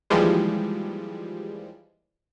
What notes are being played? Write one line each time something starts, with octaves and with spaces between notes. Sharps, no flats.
D#2 E3 F3 G3 G#3